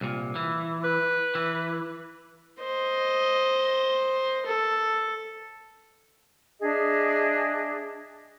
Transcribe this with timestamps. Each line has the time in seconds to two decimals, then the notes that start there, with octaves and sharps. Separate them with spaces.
0.01 C2 A#2
0.35 E3
0.84 B4
1.35 E3
2.61 C5 D#5
4.46 A4
6.60 D4 G#4 D#5 E5